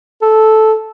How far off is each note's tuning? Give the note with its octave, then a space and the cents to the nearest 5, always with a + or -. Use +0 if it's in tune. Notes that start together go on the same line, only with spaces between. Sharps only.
A4 -10